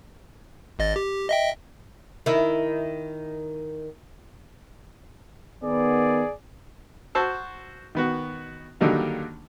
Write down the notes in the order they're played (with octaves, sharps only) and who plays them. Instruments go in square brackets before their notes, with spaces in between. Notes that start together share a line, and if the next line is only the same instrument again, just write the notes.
[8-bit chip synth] G#1 D#5 A6
G4
D#5 E5 G5
[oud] D#3 E4
[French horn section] D#3 B3 [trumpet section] G#4 D5
[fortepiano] F#4 C5 A5 E6
D#3 B3 F#4
D3 D#3 F#3 G3 A#3 D#4